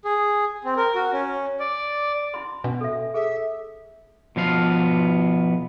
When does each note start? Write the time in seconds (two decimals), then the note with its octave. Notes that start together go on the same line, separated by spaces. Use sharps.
0.05 G#4
0.64 C4
0.77 A#4
0.95 F#4
1.12 C#4
1.60 D5
2.34 E4 B5 C6
2.64 B2 D4
2.81 A4 E5
3.14 G#4 A4 E5
4.36 B2 F3 B3 F5